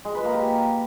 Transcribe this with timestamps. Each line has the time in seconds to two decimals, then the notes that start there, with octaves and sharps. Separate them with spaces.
0.05 G#3
0.15 B4
0.24 A#3
0.34 G4